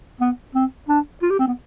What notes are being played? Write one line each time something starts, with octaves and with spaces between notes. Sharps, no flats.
B3
C4
D4
F4
G4
C4
B3